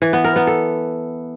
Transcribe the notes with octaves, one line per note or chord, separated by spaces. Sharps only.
E3
B3
A#4
B3
A4